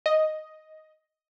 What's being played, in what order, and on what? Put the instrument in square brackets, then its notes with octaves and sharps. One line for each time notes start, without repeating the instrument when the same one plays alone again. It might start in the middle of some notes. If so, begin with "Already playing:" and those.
[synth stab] D#5